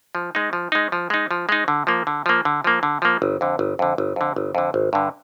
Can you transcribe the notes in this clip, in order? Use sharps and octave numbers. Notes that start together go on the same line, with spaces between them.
F3
G#3 D#4
F3
G#3 D#4
F3
G#3 D#4
F3
G#3 D#4
D3
F3 A#3
D3
F3 A#3
D3
F3 A#3
D3
F3 A#3
G1
F2 D3
G1
F2 D3
G1
F2 D3
G1
F2 D3
G#1
G2 D3